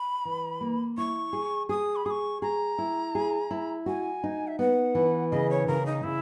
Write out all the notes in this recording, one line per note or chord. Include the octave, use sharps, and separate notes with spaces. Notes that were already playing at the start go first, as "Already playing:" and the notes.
Already playing: B5
E3
A#3
E4 C#6
G#4
G#4 D#6
B5
G#4 C#6 D#6
G#4 A#5
E4
G#4
E4
F#4 G#5
D#4
E5
B3 F#5
E3
C#3 D#5
C#5
C#3 A#4
D#4
C#3 E4